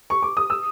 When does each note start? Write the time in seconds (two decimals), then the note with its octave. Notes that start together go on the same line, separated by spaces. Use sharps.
0.10 C#6
0.23 D6
0.37 D#6
0.50 E6